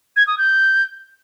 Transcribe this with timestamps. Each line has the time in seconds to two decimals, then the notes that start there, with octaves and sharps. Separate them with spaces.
0.16 G#6
0.27 D#6
0.38 G6